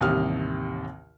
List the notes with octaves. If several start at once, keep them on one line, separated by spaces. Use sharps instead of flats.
A1 D#2 C3 G3 D#6 F6